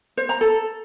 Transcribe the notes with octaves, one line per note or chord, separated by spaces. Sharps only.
C5
A#5
A4